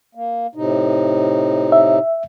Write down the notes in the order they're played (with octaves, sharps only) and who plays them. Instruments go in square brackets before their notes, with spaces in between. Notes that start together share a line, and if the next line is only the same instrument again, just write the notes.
[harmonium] A#3
A2 C3 D#4
[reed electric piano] E5